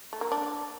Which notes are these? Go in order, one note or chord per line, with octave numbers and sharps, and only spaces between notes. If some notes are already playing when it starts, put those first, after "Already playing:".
A3
A#3
D4